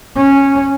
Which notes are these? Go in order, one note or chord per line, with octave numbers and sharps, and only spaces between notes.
C#4